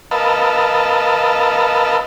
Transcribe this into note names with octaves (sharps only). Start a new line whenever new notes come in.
A#4 B4 D#5 F5 A5 E6